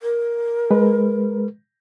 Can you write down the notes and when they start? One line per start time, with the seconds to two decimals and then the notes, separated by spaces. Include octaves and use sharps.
0.02 A#4
0.71 G#3 B4